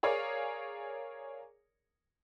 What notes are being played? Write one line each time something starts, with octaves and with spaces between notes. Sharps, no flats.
G#4 A#4 C#5 D5 F5